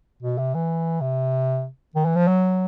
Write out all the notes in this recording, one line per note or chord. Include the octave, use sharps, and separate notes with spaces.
B2
C3
E3
C3
D#3
E3
F3
F#3